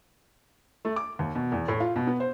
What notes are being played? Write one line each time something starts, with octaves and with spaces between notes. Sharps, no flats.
A3
D6
D#2
B2
E2
A2
F4
B2
B3
C5